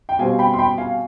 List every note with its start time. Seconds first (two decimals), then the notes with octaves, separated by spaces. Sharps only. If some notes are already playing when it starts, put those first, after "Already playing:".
0.09 G5
0.19 B2 G3 C4 F5 G#5
0.39 G5 B5
0.54 C6
0.58 G5 B5
0.78 F5 G#5